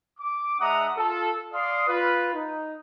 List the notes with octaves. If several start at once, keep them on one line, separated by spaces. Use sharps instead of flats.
D6
G#3 D4 E5 F#5 A#5 D#6
F4 A4
D5 F5 C6 D#6
F4 B4
D#4